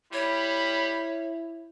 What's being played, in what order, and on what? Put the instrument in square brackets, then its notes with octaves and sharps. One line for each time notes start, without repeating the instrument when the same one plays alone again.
[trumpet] G3 [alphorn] E4 [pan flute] C#5 [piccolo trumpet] B5